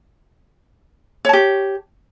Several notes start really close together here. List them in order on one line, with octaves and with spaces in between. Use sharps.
C#5 A5 G4